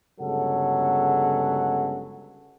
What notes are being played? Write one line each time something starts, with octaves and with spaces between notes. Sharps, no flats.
G1 C#3 F#3 G#3 A4 F#5